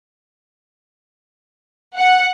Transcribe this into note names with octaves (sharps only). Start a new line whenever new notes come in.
F#5